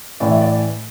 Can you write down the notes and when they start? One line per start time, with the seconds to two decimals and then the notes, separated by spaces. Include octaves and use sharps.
0.20 A2 E3 D5
0.31 E5
0.41 D5